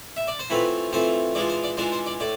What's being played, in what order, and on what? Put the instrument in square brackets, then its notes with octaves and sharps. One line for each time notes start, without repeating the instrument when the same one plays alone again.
[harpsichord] E5
D5
C5
E3 A3 C4 F4 B4
E3 A3 C4 F4 C5
E3 G#3 D4 F4 D5
C5
D5
E3 G#3 D4 F4 C5
C5
D5
A2 D5